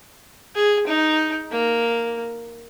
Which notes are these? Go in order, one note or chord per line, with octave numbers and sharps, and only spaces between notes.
G#4
D#4
A#3